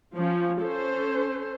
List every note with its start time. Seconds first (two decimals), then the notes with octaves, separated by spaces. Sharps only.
0.14 F3 C#4
0.60 C#4 A4 C5